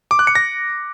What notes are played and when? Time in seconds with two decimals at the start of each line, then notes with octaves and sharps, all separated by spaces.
0.11 D6
0.19 F#6
0.27 C#7
0.35 A#6